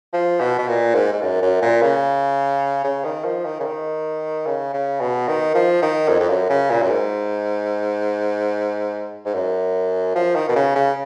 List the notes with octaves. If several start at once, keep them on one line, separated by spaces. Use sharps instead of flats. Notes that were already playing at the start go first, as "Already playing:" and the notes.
F3
B2
B2
A#2
G#2
G#2
F#2
F#2
A#2
C#3
C#3
D#3
F3
D#3
C#3
D#3
C#3
C#3
B2
D#3
F3
D#3
F2
F2
F#2
C#3
A#2
F#2
G#2
G#2
F#2
F3
D#3
B2
C#3
C#3